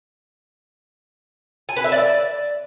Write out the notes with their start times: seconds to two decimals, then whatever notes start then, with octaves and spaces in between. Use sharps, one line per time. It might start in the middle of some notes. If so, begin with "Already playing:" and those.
1.69 G#5
1.76 B4
1.84 E5
1.92 D5